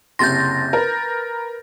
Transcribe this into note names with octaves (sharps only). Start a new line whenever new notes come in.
F#1 C3 C6 G6 A6 A#6
A#4 B4